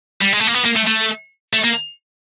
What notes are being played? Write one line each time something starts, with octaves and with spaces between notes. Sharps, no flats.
G3
G#3
A3
A#3
B3
A#3
A3
A3
A3
A#3